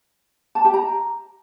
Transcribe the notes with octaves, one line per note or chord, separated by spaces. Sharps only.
A5
G4
A#5